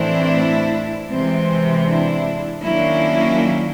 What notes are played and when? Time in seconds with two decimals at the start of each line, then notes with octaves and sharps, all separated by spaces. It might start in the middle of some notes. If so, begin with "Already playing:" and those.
Already playing: A2 E3 A3 C4 D4 E4
1.10 C3 E3 G#3 C4
1.87 D4 E4
2.63 D#3 F#3 A#3 C#4 D4 E4